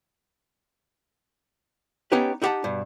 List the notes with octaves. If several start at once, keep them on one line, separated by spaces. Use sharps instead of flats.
B3 C#4 D#4 G4 B4 C#5
D#4 E4 G4 F#5 A5
G2 B2